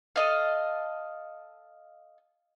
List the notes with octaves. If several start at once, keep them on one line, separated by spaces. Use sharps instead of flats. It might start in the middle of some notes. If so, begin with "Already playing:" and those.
A4 D#5 F5